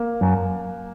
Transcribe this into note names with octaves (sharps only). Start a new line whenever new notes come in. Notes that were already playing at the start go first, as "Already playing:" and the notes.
Already playing: A#3
F#2